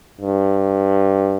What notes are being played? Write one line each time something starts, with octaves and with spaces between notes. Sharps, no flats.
G2